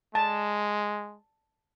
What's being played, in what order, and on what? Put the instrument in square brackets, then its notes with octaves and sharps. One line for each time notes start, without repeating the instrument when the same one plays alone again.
[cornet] G#3 [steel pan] A5